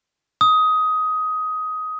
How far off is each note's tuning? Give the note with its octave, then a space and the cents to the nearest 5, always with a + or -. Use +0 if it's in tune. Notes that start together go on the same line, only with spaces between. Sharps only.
D#6 +15